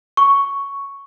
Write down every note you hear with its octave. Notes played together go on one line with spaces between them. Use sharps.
C#6